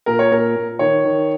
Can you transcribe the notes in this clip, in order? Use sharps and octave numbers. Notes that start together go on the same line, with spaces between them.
A#2 A#4
C#5
A#2 A#4
A#2
D#3 C#5
D#3